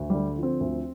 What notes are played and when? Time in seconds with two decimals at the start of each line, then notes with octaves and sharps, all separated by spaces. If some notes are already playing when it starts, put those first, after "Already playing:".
Already playing: D2
0.10 D3 G3
0.38 F3 C4
0.60 D2